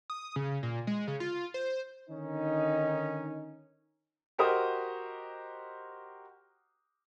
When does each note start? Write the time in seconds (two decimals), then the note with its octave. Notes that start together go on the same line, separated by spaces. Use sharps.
0.10 D#6
0.36 C#3
0.63 A#2
0.87 G#3
1.08 C#3
1.20 F4
1.54 C5
2.10 D3 D#3 C#4 D#4
4.38 F#4 G4 A#4 C5 D#5 D#6